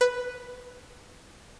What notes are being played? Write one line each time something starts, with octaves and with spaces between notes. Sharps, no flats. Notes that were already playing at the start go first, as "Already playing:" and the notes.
B4